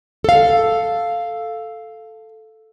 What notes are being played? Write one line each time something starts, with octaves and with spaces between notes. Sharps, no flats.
A4 F5